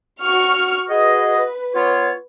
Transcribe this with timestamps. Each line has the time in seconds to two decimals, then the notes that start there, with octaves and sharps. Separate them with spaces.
0.23 F#4 C#6 F6
0.90 F#4 G#4 B4 D#5
1.74 B3 F4 C#5